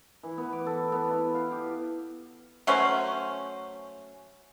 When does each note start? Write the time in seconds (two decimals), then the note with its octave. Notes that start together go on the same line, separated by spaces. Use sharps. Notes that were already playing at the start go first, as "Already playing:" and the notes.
0.23 E3
0.37 B3
0.53 D6
0.66 A4
0.92 B3
1.11 E4
1.35 F5
1.51 G4
2.67 F#3 A3 C#4 C5